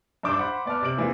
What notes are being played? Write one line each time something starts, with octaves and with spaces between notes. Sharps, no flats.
G2 D4 D6 G6 E7
C5 F#5 B5 C6
B3 D5 A5 F6
C3 D5 D7 F#7
E3 G#3 A#3 C4 D#4 F4